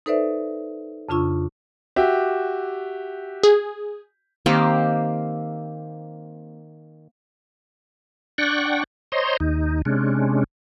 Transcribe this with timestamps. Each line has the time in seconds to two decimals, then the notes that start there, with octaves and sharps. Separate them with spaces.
0.06 D#4 A4 B4 C5 D5 E5
1.09 F2 C#3 D4 F4 C#6 E6
1.96 F#4 G4 E5
3.43 G#4
4.46 D#3 A#3 C4 G4
8.38 D4 D5 F#5 G5 C#6
9.12 C5 C#5 D#5 A#5 C6
9.40 D#2 D#4
9.85 C3 G#3 C#4 D4